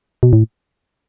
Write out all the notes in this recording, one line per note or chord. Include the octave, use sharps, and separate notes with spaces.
B2
A2